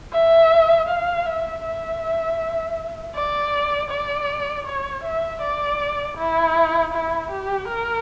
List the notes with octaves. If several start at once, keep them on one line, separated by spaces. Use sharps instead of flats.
E5
F5
E5
E5
D5
D5
C#5
E5
D5
E4
E4
G4
A#4